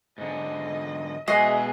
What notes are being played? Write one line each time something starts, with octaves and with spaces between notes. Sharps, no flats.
G#2 D3 D#5
B2 G#3 F#4 G#4 D#5 E5 C7